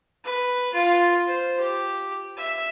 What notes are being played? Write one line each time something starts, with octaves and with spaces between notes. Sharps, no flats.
B4
F4
C5
G4
E5